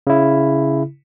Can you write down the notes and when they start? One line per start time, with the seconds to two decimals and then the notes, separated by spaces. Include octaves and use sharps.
0.07 C#3 E4